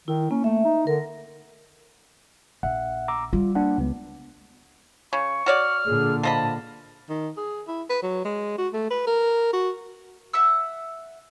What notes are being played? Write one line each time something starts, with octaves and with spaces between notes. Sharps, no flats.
D#3 E4
A#3 C#4
A3 E5
D#4
D3 A#4
A#1 E5 F#5
A#5 D6 E6
G3 F4
A#3 D4 F#5
C#2 B3
C#3 C#6
F#4 C#5 D5 F6
A#2 D3 G#4
F3 D#5 A5 B5
D#3
G#4
E4
B4
F#3
G#3
F#4
A3
B4
A#4
F#4
E5 F#5 E6